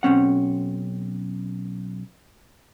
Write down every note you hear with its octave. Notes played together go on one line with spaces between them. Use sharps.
B1 C4 C#4 F#5